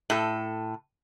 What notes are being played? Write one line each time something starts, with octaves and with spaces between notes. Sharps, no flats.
A2 A4